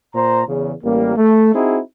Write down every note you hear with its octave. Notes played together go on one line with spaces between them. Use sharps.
A#2 C5 A#5
E2 C#3
A1 G3 A#3
A3
C4 D#4 E4 F#4 G#4